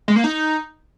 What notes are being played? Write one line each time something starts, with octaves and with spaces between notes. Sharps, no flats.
G#3
A#3
D#4